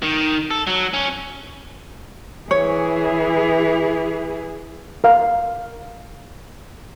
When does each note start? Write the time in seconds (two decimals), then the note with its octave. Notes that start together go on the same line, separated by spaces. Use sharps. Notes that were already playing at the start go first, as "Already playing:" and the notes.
0.03 D#3
0.51 A4
0.67 F#3
0.93 C#4
2.51 E3 G#4 C#5
5.04 A#4 F5